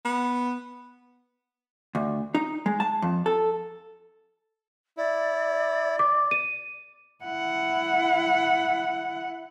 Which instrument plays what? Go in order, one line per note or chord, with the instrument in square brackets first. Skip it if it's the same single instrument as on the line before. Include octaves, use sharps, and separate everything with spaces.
[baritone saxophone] B3
[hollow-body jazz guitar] D2
D#4
G#3
A5
F2
A4
[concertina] E4 [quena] D5
[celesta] D6
D#7
[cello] E4 F#5